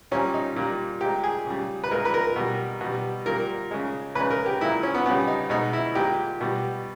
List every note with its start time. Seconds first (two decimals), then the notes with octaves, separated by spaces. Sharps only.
0.11 A#2 G3 C#4
0.34 D#4
0.56 A#2 G3
1.01 A#2 G#3 G4
1.24 G#4
1.46 C#3 G3
1.84 B4
1.91 A#2 G#3 A#4
2.05 B4
2.14 A#4
2.36 B2 G3
2.81 B2 G3
3.26 A#2 G3 A#4
3.71 C#3 G#3
4.15 C#3 G#3 B4
4.30 A#4
4.46 G4
4.61 A#2 G#3 E4
4.83 C#4
4.94 B3
5.06 C#3 G3 B3
5.28 D#4
5.50 B2 G#3 D#4
5.73 E4
5.95 A#2 G#3 G4
6.41 B2 G3